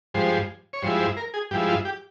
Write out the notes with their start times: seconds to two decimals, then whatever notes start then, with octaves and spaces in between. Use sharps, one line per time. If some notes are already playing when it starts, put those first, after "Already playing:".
0.14 G2 F3 G#3 C5
0.73 C#5
0.83 G2 F3 G#3 E4 C5
1.00 C5
1.17 A#4
1.34 G#4
1.51 G2 F3 G#3 E4 G4
1.68 F4
1.85 G4